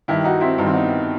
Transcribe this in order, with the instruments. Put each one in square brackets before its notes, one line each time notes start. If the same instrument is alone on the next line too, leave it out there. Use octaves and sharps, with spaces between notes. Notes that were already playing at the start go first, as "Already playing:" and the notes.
[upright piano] G2 D#3 E4 G4
D#4 F#4
C4 E4
G2 D#4
D#3 C4
B3 D#4